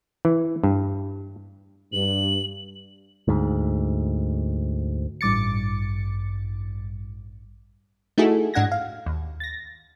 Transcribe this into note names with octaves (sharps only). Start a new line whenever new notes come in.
E3
G2
G2 F#7
D2 G#2
A1 G2 D6 A6 C#7
A3 D#4 E4 F#4 G#4 A4
G#2 D4 F#5 G#6 A#6
F5
D#2
A6 A#6